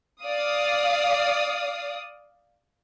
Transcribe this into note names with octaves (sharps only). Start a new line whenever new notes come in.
D5 F5 D#6